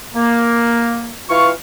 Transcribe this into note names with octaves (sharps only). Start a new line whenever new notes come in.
A#3
E3 F4 F5 C#6